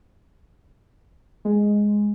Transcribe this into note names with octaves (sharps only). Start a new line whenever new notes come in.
G#3